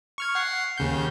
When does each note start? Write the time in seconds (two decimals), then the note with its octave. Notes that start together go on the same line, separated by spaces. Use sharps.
0.18 C#6 F6 G#6
0.35 F#5 C7
0.78 D#2 C#3 G6